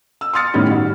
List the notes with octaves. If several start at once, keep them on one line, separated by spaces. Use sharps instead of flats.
E6
C6 D#6 F6 A6 C#7
A2 D#3 G3 B3 C#4
D#3 F#4